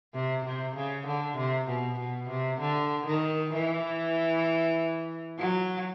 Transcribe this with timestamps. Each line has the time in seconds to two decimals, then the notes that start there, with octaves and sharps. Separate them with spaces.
0.14 C3
0.45 C3
0.75 C#3
1.06 D3
1.37 C3
1.68 B2
1.99 B2
2.29 C3
2.60 D3
3.06 D#3
3.53 E3
5.38 F#3